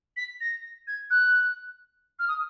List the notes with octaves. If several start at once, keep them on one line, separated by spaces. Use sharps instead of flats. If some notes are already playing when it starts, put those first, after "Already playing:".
B6
A#6
G#6
F#6
F6
D#6